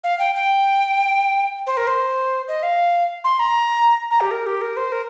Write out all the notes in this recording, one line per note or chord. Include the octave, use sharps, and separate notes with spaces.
F5
G5
G5
C5
A#4
C5
D#5
F5
C6
A#5
A#5
G4
A#4
G4
A#4
C5
A#4